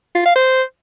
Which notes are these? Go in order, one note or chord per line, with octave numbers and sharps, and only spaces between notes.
F4
F5
C5